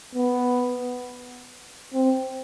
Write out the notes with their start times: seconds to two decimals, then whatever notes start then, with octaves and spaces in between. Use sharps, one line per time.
0.15 B3
1.93 C4